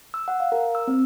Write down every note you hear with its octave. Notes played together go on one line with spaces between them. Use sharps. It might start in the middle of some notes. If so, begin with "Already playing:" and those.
E6
F#5
F5
A#4
E6
C4